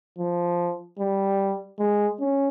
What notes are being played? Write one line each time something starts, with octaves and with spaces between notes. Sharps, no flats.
F3
G3
G#3
C#4